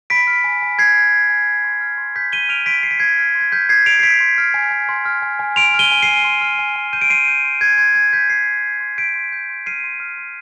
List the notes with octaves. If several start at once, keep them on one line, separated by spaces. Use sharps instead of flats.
B5 B6 D7
F6
G#5
G#5
B5 G#6 C7
F6
G#5
G#5
F6
C6
F6
C6
F6 G6 B6
C6 D#7 G7
F6 D7 F7
C6 B6 D7
F6 C7
B6
C6 G#6 C7
F6
C6
G#6
F6 G6 B6
C6 G#6 C7
F6 D7 F7
C7
C6 B6 D7
C6
F6
G#5
G#5
C6
F6
G#5
G#5
C6 D7 F7
F6
D#7 G7
G#5
C7 D#7
G#5
C6
F6
G#5
G#5
G6 D#7
D7
C6 C7 D#7
G6
C6
G6 G#6
C6 G#6
G6 G#6
C6 G6 B6
G6 G#6 C7
C6
G6
C6
G6 B6 D7
C6
G6
C6
F6 C7 D#7
C6
F6
C6